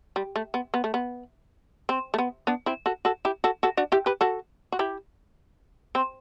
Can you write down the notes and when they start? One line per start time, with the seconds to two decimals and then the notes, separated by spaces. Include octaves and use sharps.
0.16 G3
0.36 A3
0.54 B3
0.74 B3
0.84 A3
0.94 B3
1.89 C4
2.14 A3
2.18 B3
2.47 B3 D4
2.66 C4 E4
2.86 F#4 A4
3.05 F#4 A4
3.25 E4 G4
3.44 F#4 A4
3.63 F#4 A4
3.77 D4 F#4
3.92 E4 G4
4.06 G4 B4
4.21 F#4 A4
4.72 F#4
4.79 E4 G4
5.95 C4